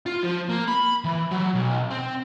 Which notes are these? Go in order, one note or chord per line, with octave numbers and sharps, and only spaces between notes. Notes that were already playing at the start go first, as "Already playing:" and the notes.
F4
F3
A#3
B5
E3
F#3
B1
C4